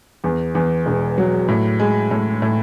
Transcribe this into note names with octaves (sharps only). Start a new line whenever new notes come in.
E2
E2
E1
F#3
A2
G#3
A2
A2